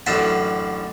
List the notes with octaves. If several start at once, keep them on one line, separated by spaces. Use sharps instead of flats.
A1 F#2 D3 D4 B4 C5